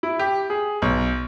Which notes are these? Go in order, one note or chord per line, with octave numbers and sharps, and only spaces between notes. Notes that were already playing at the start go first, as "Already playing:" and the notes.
E4
G4
G#4
B1